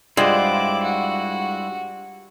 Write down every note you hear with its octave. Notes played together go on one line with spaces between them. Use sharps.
G2 G#3 E4 F4 C5 F#5 D6
F#4